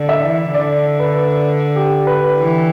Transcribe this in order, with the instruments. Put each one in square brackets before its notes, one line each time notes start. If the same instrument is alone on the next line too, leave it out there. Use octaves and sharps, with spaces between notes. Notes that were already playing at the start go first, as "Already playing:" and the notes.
Already playing: [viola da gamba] D3 [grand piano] D5
[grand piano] E5
[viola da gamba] E3
[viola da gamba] D3 [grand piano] D5
[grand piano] B4
G4
B4
[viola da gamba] E3